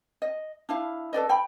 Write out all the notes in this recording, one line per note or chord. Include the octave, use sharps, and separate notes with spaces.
D#5
D4 E4 F5
A4 B4 D5 D#5
G5 B5